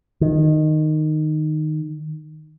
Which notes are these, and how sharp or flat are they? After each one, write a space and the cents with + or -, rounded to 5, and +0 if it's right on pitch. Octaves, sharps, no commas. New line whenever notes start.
D#3 -10